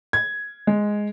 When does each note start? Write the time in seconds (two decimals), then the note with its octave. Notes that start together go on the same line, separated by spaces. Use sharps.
0.13 G#6
0.67 G#3